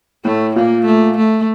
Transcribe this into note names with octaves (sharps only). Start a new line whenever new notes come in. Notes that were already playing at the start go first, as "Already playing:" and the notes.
A2 A3
A#2 A#3
A3
A3